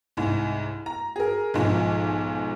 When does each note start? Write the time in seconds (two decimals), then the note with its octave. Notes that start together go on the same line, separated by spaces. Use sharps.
0.17 C2 G#2
0.86 A#5
1.16 G#4 A#4
1.54 B1 G#2 F3